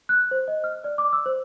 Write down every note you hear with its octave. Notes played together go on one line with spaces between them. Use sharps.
F#6
C5
D#5
F6
D5
D6
E6
C5